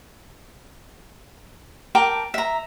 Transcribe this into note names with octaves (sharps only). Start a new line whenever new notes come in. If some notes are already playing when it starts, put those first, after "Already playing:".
A#4 G5 A5 D6
E5 A#5